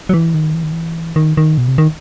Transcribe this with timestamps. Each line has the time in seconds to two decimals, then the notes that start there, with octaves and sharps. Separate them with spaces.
0.09 F#3
0.14 E3
0.34 D#3
0.55 E3
0.63 D#3
0.72 E3
1.16 D#3
1.37 D#3
1.58 B2
1.68 C3
1.78 D#3